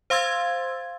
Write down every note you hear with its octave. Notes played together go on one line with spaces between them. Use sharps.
C5 F5 C6 E6 G#6 A6